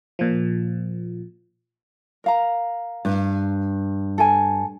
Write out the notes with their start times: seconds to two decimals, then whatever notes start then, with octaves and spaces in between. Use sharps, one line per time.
0.19 A#2 F3
2.24 A#4 F5 A#5
3.05 G2
4.18 A4 G5 G#5